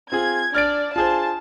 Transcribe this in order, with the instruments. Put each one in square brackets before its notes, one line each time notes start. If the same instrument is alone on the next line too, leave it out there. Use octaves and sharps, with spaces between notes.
[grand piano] C4 F4 G#4 [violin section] G#6
[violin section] D4 D5 [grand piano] F6 A6 D7
[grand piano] F4 G#4 C5 [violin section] A5